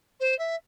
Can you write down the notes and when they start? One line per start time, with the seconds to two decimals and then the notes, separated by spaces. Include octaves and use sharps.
0.20 C5
0.38 E5